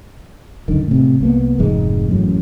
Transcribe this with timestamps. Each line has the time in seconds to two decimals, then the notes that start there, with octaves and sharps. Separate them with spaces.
0.68 C#2 F#2 D3 D#3
0.87 A2 C3
1.20 C2 A#3 B3
1.59 F1 F2 G#2 G#3
2.09 A1 F#2 A2